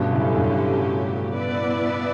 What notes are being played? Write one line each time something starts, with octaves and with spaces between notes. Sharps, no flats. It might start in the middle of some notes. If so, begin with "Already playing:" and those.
Already playing: G2 B2 D3 F#3 A3 C#4 G4
A2 C#3
G2 B2
B3 E4 B4 D5